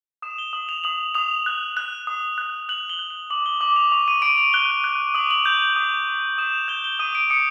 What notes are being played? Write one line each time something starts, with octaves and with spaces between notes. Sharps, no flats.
D#6 E7
G7
D#6 F#7
F7
D#6 F#7
D#6 F7
F#6
F#6
D#6
F#6
F#6 F#7
G7
F#6
F#7
D6 F#7
G7
D6 F#7
F7
C#6 F7
D#7
C#6 D7
F7
F#6 G7
F#6
D#6 F#7
F#7
G6 F7
F#7
D#6
D#6
D#6 E7
F7
G6 G7
G7
D#6 D#7
D7
D#6 C#7